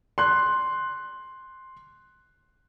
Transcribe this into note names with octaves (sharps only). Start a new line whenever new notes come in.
C6 F#6